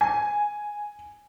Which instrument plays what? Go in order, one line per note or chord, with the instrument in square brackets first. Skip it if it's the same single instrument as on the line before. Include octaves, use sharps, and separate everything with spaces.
[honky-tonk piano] G#5